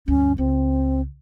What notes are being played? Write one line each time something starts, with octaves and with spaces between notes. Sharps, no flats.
D2 G2 C#4
C#2 C4